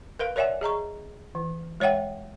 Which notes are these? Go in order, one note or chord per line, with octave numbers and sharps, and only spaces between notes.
A#4 B4 F5
A#4 C#5 D5 E5 F#5 G#5
G#4 D#5 A#5 C#6
E3
G#3 C#5 E5 F#5 G5